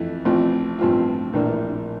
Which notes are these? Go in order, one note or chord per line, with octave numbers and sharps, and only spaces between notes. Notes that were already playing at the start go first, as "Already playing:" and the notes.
Already playing: F2 E3 A3 E4
A1 A2 F3 C4
A1 G2 F3 C4 F4
A#1 A2 E3 A#3 D4